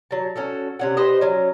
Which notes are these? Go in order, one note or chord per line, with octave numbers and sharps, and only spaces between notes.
F#3 A5
C#4 F#4 A4
C3 C#4 F#5
G4 B4 C5 D#5
F#3 C#4